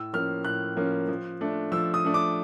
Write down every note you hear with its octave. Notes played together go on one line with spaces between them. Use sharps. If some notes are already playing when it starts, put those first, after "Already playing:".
Already playing: A2 E6
F3 A#3 C#4 F6
A2 F#6
F3 A#3 C#4
F3
A3 D4
F3 E6
D#6
A3 D4
D6